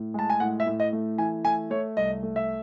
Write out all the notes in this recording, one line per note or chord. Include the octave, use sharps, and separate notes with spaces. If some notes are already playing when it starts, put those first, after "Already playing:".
Already playing: A2
G#3 A5
G#5
A2 F#5
E5
A2
D#5
A3
E3 G#5
A3 G#5
A3 C#5
C2 D#5
A3
E5